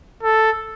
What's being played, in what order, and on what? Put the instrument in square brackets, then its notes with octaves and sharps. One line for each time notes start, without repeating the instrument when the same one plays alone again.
[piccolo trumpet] A4